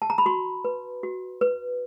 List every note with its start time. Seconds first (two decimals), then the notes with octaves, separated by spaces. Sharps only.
0.02 A5
0.10 A#5
0.18 B5
0.26 F#4 C6
0.64 B4
1.03 F#4
1.41 B4